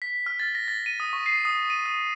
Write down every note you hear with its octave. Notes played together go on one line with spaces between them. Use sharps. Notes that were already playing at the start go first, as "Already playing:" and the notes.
B6
F6
A6
A#6
A6
D#7
D#6
C#6
C7
D#6
D#7
D#6